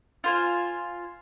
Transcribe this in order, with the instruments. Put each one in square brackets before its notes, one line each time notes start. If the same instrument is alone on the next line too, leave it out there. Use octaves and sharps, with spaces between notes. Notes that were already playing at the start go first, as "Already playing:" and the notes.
[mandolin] F4 C5 G#5